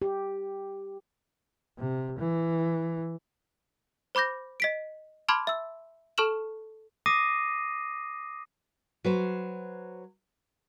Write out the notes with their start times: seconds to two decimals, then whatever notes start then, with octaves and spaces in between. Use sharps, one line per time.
0.02 G4
1.79 C3
2.19 E3
4.15 C5 B5 D6 G6 A#6
4.60 D#5 B6 D7
5.29 A5 B5 C6 D6 F6 G#6
5.47 E5 E6
6.18 A4 A5 C#6 F6 E7 F#7
7.06 D6 D#6 A#6 C7 D#7
9.05 F#3 B4 C5